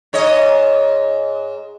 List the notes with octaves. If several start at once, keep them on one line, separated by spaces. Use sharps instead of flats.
G#2 C#5 D#5